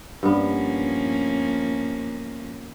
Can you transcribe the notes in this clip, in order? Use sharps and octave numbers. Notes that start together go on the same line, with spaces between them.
G2 F3 A#3 B3 C#4